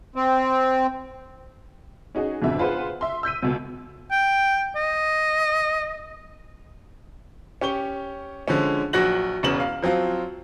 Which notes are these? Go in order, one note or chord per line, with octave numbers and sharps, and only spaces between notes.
C4
C#4 D#4 F#4 G#4
F2 G#2 B2 D3 E5
F4 G#4 B4 C5 F#5
E5 C6
E6 G6 B6 D#7
C#2 B2
G5
D#5
C#4 G4 C#6 G7
D3 F3 G#3 C#4
A#1 F#3 F#4 F#6 A#6 F#7
E1 E2 C#3 C#4 E7 F#7
F5
F3 F#3 C4 F4